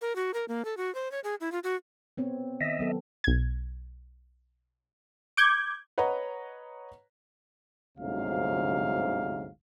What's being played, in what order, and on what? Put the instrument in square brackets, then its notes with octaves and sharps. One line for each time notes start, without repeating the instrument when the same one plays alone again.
[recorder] A#4
F#4
A#4
A#3
A4
F#4
C5
C#5
G#4
E4
F4
F#4
[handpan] B3 C4 C#5
[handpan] D#3 [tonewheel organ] D#5 E5
[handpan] F#3 B3 A4
[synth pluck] B1 G#6
[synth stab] D6 G6 G#6 [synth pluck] C#7
[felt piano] B4 C#5 D#5 F#5 A#5
[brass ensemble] G1 D2 G#2 C3 F#3 F5